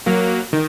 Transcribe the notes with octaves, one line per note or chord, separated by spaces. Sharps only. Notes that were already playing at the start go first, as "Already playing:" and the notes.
F#3 A#3
D#3